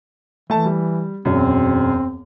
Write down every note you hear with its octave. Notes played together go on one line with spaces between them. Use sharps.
E3 A3 A5
G3
E1 F#2 C4